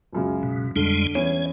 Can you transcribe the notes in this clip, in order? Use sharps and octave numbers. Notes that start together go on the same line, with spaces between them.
C#2 F#2 C#3
B2
F2 D3 G3 G#3
E2 C#4 C#5 D#7